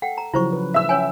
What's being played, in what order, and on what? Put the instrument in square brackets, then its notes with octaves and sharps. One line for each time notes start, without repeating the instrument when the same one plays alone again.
[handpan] A4 [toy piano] F#5 G5
[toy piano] A#5
[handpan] C#3 F3 F#3 [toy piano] E4 C5 C#6
[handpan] B4
[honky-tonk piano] E5 E6
[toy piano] C#4 C#5 G#5